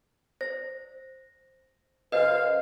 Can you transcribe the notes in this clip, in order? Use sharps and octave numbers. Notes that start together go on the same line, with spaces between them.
C5 A#6
F#2 C#3 B4 C5 D#5 F5